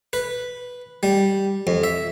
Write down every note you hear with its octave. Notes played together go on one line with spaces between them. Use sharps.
B4
G3
F2
E5